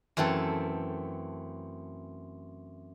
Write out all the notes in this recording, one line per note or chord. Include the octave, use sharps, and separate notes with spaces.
F#2 E3 A3 C4 A4